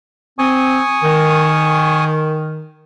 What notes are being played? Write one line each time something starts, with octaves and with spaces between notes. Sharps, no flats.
C4 G#5 C#6 D#6
D#3